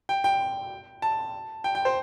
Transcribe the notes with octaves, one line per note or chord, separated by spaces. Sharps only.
G5
G5
A5
G5
G5
C5